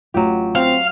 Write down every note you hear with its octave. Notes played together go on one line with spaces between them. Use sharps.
A1 F#3 F4 G4
C4 F5